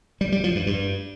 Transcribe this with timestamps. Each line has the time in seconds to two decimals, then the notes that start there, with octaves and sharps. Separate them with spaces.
0.21 G3
0.32 G3
0.44 F3
0.55 G2
0.67 G2